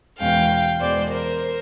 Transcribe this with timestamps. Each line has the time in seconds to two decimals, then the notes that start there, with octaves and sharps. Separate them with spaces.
0.20 E2 B2 G#3 C#4 F5 G5
0.80 E2 B2 G#3 C5 D5
1.10 A#4 C5